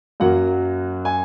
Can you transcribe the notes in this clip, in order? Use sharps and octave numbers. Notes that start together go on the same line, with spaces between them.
F#2 F#3 A#3 F#5
G#5